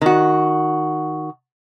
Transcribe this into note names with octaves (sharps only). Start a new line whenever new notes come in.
D#3 F#4